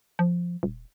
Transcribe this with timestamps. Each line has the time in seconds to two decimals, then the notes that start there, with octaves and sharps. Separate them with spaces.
0.19 F3
0.63 D#1